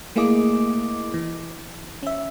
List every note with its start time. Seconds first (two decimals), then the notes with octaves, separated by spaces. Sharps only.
0.16 A3 A#3 E4 G#4 D#5 D6
1.14 E3
2.03 C#4 E5